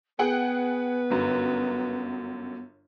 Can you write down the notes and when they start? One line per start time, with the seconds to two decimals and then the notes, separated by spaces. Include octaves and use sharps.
0.19 B3 G#4 B4 F#5 G5
1.10 G1 F#2